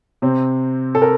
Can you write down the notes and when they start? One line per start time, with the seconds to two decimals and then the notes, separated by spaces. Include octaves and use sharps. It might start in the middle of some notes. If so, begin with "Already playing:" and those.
0.22 C3 C4
0.95 A4
1.02 A#4